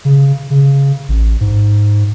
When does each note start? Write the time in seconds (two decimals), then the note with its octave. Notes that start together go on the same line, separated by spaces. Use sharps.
0.05 C#3
0.50 C#3
1.09 A1
1.41 G#2